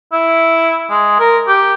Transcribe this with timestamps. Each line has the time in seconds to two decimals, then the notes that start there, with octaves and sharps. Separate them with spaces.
0.12 E4
0.90 G#3
1.19 A#4
1.47 G4